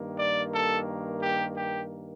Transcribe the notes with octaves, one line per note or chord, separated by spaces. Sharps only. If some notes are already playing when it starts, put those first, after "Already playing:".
Already playing: G2 D#3 A#3
D5
A4
G4
G4